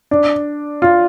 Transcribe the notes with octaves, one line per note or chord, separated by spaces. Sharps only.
D4
F4